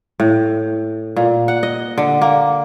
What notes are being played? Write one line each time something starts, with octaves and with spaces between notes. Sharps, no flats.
A2
A#2
F#5
D#5
D3
A#3